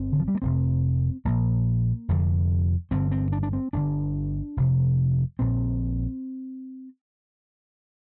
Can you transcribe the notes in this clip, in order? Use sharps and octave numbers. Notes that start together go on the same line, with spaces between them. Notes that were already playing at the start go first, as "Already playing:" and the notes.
Already playing: G1 C4
D3
F3
G3
A#3
F1 F2 C3 C4
A#1 A#2 A#3
F1 F2 D3
G1 G2 D3 C4
C4
D4
D4
C4
G1 G2 D3 D4
F1 F2 C3
A#1 A#2 C4